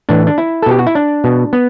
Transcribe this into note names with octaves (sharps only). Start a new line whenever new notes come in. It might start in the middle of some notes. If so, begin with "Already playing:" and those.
A2 E3 D4
D4
E4
A4
B2 G4
F#4
E4
D4
B2
B3